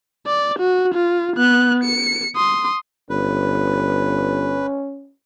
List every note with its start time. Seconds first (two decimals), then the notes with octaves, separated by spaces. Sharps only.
0.27 D5
0.59 F#4
0.94 F4
1.37 B3 F#6
1.84 C#7
2.36 C6 D#6
3.10 G1 C#4 B4